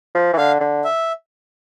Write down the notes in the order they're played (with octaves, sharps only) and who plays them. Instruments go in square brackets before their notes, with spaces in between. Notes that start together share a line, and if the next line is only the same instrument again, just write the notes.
[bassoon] F3
E3
[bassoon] D3 [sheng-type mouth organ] F5
[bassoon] D3
[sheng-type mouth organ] E5